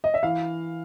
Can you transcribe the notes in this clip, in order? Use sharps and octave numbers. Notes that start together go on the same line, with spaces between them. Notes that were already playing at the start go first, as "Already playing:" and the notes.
D#5
E5
E3 F5